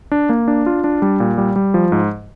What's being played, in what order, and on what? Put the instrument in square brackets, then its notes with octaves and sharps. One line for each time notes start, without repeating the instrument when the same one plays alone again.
[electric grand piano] D4
A#3
D4
F4
D4
G3
A#2
G3
G3
F3
G#2